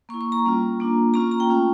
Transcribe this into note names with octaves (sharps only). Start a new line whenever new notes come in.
A#3 E4 C#6
C#6
A#5
G3 A#3 C#4 F4
A#3 D4 F4
A#3 C#4 F4 A#5
A#5
G5
A3 C#4 F4